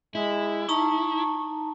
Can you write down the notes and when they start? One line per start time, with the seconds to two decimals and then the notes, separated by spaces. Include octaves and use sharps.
0.15 G#3 E4
0.69 D#4 A5 A#5 C#6